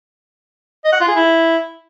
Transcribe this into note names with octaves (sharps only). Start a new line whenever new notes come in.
D#5
F#5
F4
G#4
E4